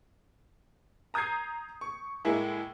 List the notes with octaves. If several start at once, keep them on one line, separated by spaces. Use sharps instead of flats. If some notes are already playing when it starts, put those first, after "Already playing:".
A#5 D#6 G6 G#6 C7
C#6
A2 G#3 A#3 E4 G#4